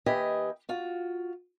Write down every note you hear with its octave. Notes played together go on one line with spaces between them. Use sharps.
D#2 G4 B4 D#5 E5 G#5
F4 F#4